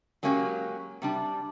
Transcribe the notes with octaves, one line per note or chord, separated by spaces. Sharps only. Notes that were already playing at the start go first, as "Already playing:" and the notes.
F#3 G#3 A#3 C#4 F#4 G4
C3 G3 D4